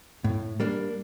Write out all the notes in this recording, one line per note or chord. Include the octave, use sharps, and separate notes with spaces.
A2
G3 A#3 D4